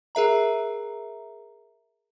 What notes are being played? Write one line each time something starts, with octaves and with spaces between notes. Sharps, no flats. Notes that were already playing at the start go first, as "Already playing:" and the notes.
G#4 A#4 E5 A#5